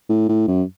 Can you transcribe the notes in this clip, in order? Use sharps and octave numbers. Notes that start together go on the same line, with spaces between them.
A2
A2
F#2